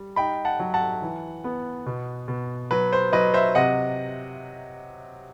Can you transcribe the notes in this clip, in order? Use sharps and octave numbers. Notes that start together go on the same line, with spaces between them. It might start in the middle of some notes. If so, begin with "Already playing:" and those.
Already playing: G3
D#4 G5 B5
F#5 A5
F#3
F#5 A5
E3
B3
B2
B2
F#3 B4
C5
F#3 B4 D#5
C5 E5
C3 D#5 F#5